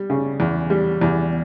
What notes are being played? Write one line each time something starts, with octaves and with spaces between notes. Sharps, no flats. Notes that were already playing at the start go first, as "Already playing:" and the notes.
Already playing: G3
C#3
E2
G3
E2